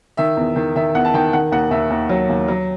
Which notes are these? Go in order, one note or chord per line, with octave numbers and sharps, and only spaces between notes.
D#3 E5
E2
D#3
D#3 E5
E2 F#5
A5
D#3 G5
D#3 F#5
D#2 F#5
D#2 E5
D#2
F#3
D#2
F#3